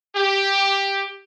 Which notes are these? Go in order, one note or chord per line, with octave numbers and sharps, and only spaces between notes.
G4